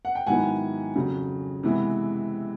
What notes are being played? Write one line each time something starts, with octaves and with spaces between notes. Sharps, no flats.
F#5
G5
G#2 D#3 F#3 B3 E4 F#5 G#5
F2 C#3 F#3
C3 E3 G#3 B3 E4